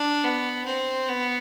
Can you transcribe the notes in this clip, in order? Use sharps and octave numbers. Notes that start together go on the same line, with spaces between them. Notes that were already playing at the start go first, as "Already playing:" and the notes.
Already playing: D4
B3
C4
B3